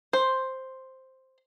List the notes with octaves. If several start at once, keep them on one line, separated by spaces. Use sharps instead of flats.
C5